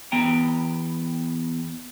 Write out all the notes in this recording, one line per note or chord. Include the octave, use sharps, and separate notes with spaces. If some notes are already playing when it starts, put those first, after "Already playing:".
E2 B3 G5 A#5